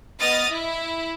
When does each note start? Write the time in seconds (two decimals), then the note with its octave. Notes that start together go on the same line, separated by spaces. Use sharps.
0.19 B3 D#5 D#6 F6 A6
0.48 E4